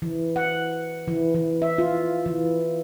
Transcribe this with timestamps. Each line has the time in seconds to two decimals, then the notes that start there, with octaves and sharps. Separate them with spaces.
0.02 E3
0.36 F#5
1.08 E3
1.34 E3
1.62 E5
1.78 F4
2.26 E3